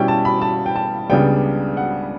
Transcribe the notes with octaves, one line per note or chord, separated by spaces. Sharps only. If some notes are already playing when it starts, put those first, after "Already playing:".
Already playing: B2 G3 C#4 E4 G5
A5
B5
A5
G5
A5
C#2 C#3 G3 B3 D4 G5
F#5